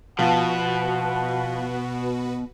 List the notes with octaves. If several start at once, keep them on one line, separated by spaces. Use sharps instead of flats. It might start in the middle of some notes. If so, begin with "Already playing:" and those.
B2 F3 F#4 B4 F#5 A5